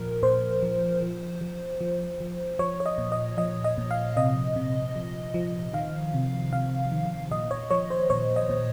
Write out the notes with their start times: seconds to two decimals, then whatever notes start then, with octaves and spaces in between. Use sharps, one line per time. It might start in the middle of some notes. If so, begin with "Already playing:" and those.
Already playing: A#2 F3 A#4
0.23 A#2 C5
0.63 F3
1.02 F3
1.41 F3
1.81 F3
2.20 F3
2.59 F3 C#5
2.80 C#5
2.86 D#5
2.98 A#2
3.12 D#5
3.37 F3 D#5
3.64 D#5
3.78 A#2
3.91 F5
4.17 C3 D#5
4.56 C3
4.96 F3
5.34 F3
5.73 D#3 F5
6.14 C3
6.53 C3 F5
6.92 D#3
7.31 A#2 D#5
7.51 C#5
7.71 F3 C#5
7.90 C5
8.10 A#2 C#5
8.36 D#5
8.49 A#2